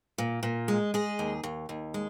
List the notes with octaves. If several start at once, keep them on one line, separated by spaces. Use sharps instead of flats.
A#2
A#2
G#3
G#3 G#4
D#2
D#2
D#2
G#3